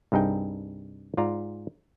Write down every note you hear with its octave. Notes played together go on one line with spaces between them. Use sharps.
C2 G2 D#4 G#4 G5
G#2 F4 D5 A#5